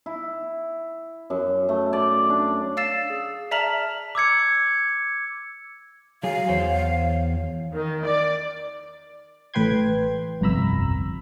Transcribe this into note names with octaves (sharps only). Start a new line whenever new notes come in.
E4
F#2
A3
D5
D4
F5 E6 A6 C7 E7
G#4
D5 E5 A5 A#5 F6 F#7
D6 E6 G#6 C#7
F#3 G#4 F5
E2 C5 C#5
D#3
D5
A1 A2 B4 G5 C6 G#6
G1 C2 F2 A#5 B5 E6